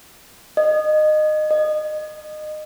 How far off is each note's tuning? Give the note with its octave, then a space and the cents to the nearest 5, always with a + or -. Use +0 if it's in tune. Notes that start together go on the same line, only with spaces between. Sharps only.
D#5 -20
D#5 -25